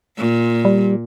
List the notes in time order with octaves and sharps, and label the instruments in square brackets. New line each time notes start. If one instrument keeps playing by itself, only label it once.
[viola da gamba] A#2
[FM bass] G3